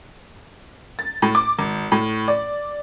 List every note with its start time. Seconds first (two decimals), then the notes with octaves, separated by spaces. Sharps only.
0.99 A6
1.22 A2
1.35 D6
1.59 G#1
1.92 A2
2.28 D5